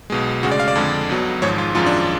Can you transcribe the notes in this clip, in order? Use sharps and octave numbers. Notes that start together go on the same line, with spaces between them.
B1 B2 G#3
D2 C#3 G#3 F#4
D5
F5
D5
F2 D3 G#3
B1 B2 F#3
G#1 G#2 F3 G#3 C#5
F4
G#1 F#2 F3 G#3 F4
D4